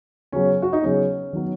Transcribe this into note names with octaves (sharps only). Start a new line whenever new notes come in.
C#3 F#3 B3 C#4
F#4
D#4
C#3 F#3 B3 C#4
D#3 F#3 B3